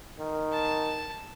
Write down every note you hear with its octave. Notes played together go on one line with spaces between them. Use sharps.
D#3
A5